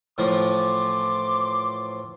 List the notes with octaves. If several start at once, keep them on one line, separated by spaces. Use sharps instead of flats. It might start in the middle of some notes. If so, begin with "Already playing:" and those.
A2 E3 F3 C6 D6